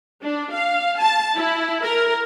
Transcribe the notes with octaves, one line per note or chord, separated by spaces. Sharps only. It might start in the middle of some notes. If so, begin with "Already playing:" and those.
D4
F5
A5
E4
A#4